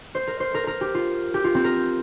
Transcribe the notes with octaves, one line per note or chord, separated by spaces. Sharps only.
C5
A#4
C5
A#4
A#4
G4
F4
G4
F4
C4
A#4